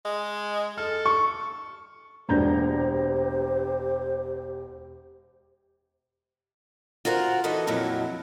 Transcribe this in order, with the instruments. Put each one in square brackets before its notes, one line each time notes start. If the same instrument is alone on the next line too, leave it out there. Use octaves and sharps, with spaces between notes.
[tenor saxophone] G#3
[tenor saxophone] A4 [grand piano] F6
[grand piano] C#6
[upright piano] E1 A#5 G6 [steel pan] A#3 D4 [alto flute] G4 [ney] C5
[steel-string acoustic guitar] F4 F#4 A#4 C5 E5 F#5
E3 D#4 F#4 A4 B4 D#5
F2 A#2 F#3 E4